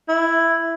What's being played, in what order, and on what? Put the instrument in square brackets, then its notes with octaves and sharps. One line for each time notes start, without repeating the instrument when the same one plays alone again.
[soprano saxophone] E4